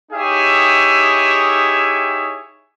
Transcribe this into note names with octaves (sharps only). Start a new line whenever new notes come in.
D#4 E4 G4 G#4 C#5 E5